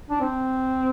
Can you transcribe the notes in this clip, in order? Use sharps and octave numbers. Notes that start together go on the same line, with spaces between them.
D4
C4